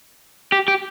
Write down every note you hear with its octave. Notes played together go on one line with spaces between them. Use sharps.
G4
G4